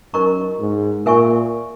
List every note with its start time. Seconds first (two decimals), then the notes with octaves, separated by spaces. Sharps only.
0.13 F#2 D#4 A#4 D#5 A#5 C#6
0.59 G#2
1.06 A#2 A#4 E5 G#5 C#6